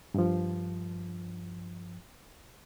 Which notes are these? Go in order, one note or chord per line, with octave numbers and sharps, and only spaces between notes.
G2 F3